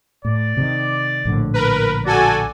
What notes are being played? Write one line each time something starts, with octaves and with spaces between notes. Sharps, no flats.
A2 D5
C3 D#3
A#1 A2 D3
A#4 B4
F#4 A4 D5 G#5